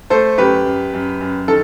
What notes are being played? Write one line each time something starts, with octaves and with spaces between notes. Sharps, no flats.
A3 A4 C5
F#2 G4 B4
F#2
F#2
F#2
D#3 A4